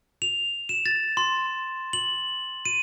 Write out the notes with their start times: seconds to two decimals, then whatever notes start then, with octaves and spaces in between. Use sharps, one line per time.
0.22 F7
0.69 E7
0.86 A6
1.17 C6
1.93 F#7
2.65 D#7